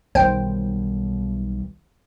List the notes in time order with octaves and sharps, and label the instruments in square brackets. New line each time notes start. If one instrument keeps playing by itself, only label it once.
[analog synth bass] B1 [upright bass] D#3 G3 [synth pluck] C5 G5